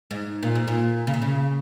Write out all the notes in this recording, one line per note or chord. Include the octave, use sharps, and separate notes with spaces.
G#2
A#2
G#2
A#2
C#3
A#2
C#3